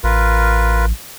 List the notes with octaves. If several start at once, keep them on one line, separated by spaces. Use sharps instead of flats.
A1 F4 A#4 B4